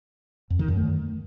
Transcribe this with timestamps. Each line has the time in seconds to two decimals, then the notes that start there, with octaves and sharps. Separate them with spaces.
0.50 F2
0.59 D#3
0.68 F#2
0.77 A3